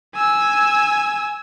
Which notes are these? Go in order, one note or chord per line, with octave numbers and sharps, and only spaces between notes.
G#5 E6